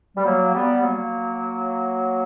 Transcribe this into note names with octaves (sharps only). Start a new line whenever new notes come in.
G3
F#3 A#3
G3 B3
F#3 A#3